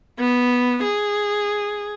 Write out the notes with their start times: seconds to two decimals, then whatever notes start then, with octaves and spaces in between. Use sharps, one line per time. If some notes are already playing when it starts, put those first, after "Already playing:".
0.19 B3
0.83 G#4